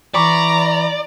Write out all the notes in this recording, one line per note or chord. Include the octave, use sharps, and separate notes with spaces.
E3 D5 A#5 B5 C#6 D6